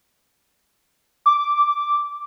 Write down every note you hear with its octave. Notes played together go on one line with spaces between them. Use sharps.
D6